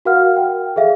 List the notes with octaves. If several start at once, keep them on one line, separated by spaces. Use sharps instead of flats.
F#4 A#4 F5 F#5 F6
G5
G#4 A4 E5 F5